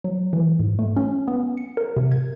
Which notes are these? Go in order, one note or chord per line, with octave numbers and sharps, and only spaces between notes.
F#3
E3
G#2
A3
C#4
B3
C#7
A#4
C3
G#6